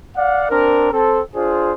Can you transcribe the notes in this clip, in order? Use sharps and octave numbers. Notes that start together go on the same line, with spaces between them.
D5 F5 F#5
C4 D4 A#4
C4 A4
D4 F4 G#4 C5